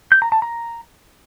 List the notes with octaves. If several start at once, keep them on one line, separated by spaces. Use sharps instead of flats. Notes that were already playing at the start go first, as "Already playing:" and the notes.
G6
A#5
A5
A#5